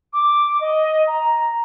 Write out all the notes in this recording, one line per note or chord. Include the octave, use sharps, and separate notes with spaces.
D6
D#5
A#5